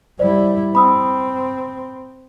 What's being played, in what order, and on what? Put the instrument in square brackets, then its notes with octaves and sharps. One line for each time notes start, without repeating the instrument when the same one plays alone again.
[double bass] G3 E4 [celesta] C5 D5
[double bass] C4 [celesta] B5 D#6 E6